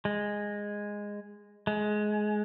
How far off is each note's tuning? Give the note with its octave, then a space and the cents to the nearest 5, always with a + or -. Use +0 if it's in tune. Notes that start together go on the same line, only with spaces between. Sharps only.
G#3 -10
G#3 +20